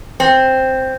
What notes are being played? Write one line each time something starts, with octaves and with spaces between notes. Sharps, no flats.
C4